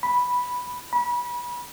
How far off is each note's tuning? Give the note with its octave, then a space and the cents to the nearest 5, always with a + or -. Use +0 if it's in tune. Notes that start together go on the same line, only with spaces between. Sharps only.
B5 -5
B5 -30